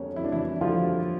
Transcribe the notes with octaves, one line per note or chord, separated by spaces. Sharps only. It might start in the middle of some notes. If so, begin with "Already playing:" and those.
Already playing: F2 D3 G3 A#3 C#4
F2 E4
D4
E3 E4
D3 F3 G3 A#3 F4